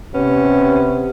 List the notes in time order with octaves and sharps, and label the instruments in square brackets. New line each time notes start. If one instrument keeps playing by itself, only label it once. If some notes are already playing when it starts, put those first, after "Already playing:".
[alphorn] C3 [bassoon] B3 [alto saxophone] C#4